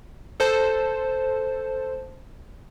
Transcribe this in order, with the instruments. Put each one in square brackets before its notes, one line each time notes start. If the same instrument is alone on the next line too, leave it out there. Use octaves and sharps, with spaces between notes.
[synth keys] A4 C5 A5